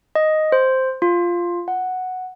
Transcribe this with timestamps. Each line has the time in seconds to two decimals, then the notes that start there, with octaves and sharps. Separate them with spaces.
0.15 D#5
0.52 C5
1.02 F4
1.68 F#5